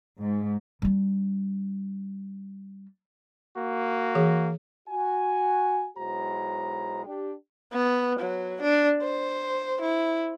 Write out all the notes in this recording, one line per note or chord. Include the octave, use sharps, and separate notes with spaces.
G#2
G3 D4
A#3 F#4
E3 G#4
F#4 G#5
B1 G#3 E4 F#4 C5 A#5
D4 G4
B3
F#3
D4
C5
E4